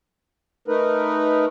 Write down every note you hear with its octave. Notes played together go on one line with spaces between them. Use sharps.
A3 D#4 A#4 B4